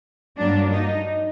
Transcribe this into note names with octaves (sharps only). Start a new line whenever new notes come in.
G2 F#3 A#3 D4
D#4